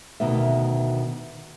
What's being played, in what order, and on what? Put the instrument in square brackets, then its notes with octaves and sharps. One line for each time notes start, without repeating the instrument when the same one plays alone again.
[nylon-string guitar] D2 B2 D#3 B3 E5